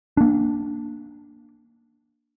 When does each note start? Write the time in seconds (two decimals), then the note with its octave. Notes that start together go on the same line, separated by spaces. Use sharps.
0.17 A#3 D4